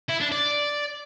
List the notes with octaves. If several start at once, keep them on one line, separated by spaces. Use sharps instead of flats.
E4
D4
D5